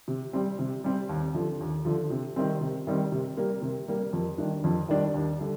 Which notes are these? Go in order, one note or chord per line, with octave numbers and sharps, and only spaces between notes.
C3
G3 C4
C3
G3 C4
D#2
D3 F3
D#2
D3 F3
C3
D#3 G3 C4
C3
D#3 G3 C4
C3
G3 A#3
C3
G3 A#3
F2
D#3 G3 D4
F2
D#3 G3 D4
D#2
D3 G3